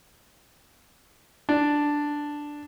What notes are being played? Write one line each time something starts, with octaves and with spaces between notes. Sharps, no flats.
D4